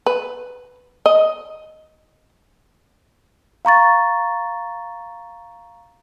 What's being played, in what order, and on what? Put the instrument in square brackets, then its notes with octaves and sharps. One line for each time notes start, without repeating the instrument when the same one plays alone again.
[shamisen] B4
D#5
[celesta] F5 A#5 C#6 A6